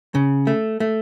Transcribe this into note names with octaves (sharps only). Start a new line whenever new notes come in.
C#3
A3
A3